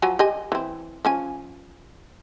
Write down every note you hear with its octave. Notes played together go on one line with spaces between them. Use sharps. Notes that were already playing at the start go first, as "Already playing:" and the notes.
F3 F#3 G#5
G4 D#5 G#5
E3 C4
F3 C#4 G#5